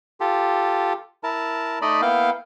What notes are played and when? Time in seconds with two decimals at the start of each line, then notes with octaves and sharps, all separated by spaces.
0.20 F4 G4 A4
1.23 E4 A#4 A5
1.82 A3 D#4 D5 D#5 B5
2.02 A#3 B3 E4 F5 G5